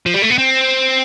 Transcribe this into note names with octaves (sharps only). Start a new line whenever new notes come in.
F3
G3
A3
B3
C4